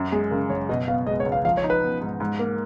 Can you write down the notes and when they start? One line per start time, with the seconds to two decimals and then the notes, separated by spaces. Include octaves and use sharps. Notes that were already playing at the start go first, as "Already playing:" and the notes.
Already playing: F#2
0.12 G#3 G#4
0.31 C#3 A#4
0.50 F#1 C#5
0.69 B2 D#5
0.88 B3 F5
1.06 G#3 D#5
1.20 C#5
1.26 C#2
1.32 F5
1.45 F3 F5
1.57 C#5
1.64 D#4
1.70 B4
1.83 B3
2.02 G#2
2.20 G#2
2.39 A#3